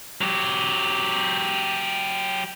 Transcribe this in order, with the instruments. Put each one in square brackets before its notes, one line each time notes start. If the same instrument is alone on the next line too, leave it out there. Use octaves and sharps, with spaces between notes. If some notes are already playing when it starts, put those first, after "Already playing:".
[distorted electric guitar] F#3 G4